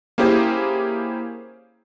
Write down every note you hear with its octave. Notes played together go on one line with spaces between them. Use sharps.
A#3 C#4 E4 G4 G#4 C5